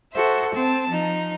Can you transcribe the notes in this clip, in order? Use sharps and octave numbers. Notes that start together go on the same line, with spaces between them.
F#4 A4 C5 E5
C4 A5
F3 D#4